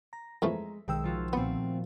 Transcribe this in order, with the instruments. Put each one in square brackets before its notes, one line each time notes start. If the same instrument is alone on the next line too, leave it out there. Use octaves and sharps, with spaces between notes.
[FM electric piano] A#5 [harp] A#6
[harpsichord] F2 E3 A3 [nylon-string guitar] G#3 [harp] E5
[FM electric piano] B1 G5 E6 [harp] D#3 [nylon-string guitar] G#3
[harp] F3 F4 F#4
[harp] A#2 A3 [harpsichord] B3 [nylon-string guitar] C4 F#5